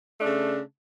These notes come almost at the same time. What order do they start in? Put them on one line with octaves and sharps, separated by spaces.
A3 D4 C#3